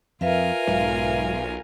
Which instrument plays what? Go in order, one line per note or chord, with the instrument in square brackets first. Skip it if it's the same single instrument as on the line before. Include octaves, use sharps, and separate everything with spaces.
[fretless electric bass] F2 [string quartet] F4 A#4 G#5 [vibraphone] B4 E5 F5
[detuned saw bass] B1 [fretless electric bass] G#2